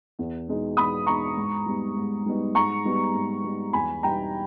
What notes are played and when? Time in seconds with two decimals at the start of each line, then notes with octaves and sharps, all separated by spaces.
0.19 E2
0.48 B2 G#3 D#4
0.77 E2 B5 D#6
1.07 B2 G#3 D#4 A#5 C#6
1.37 G#2
1.66 G3 B3 D#4
1.96 G#2
2.26 G3 B3 D#4
2.55 G#2 A#5 C#6
2.85 G3 B3 D#4
3.15 G#2
3.44 G3 B3 D#4
3.73 E2 G#5 B5
4.03 B2 G3 B3 D#4 G5 A#5